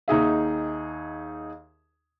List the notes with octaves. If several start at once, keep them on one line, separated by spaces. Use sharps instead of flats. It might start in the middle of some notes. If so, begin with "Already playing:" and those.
D#2 D#4 G#4 E5